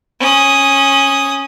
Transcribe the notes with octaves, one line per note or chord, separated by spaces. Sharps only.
C#4 D#6